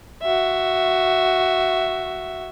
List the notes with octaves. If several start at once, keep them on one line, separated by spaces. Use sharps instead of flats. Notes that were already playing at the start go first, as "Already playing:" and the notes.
F#4 E5